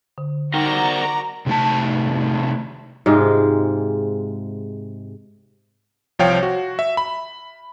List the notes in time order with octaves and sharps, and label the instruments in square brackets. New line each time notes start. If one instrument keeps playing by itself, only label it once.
[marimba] D3
[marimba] D#4 G5 [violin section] F#4 D5 A#5 [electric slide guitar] A#4 C5 F#5
[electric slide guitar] C3 D#3 A3 A5
[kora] G#2 C3 G#3 F4
[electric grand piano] C2 F3 C#5 F5 G5
F#4
E5
B5